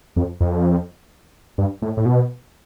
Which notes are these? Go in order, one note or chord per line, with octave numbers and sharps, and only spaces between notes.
F2
F2
G2
A2
A2
B2